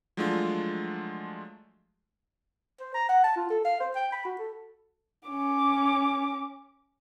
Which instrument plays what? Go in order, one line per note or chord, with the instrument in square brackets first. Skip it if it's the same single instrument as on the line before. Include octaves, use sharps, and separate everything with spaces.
[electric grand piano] F3 F#3 G#3 A3 D4 F4
[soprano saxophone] C5
A#5
F#5
A5
F4
A4
F5
C5
G5
B5
F#4
A4
[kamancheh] C#4 D6